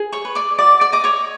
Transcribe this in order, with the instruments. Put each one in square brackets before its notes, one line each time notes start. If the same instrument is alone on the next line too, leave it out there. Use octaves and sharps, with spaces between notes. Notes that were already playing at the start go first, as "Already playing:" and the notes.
Already playing: [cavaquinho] G#4
C#5 C#6
B4
D5 D6
F#4 D5 D6
D5 D6
D#5 D6
C#5 C#6